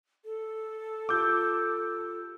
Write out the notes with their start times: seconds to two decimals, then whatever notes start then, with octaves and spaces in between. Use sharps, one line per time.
0.25 A4
1.09 F4 G4 D6 E6 G6